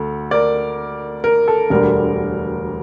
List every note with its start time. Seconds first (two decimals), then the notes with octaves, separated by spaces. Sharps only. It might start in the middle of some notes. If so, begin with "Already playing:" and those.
Already playing: D2 A4
0.31 A#4 D5
1.24 A#4
1.48 A4
1.70 E1 D2 D3 G3 A#4